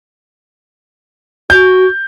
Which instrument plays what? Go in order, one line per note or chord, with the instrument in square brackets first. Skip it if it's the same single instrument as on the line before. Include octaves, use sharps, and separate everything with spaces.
[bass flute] F#4 [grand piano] G6